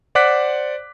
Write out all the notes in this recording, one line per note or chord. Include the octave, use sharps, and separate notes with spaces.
C5 D5 F#5 D6 F#6 B6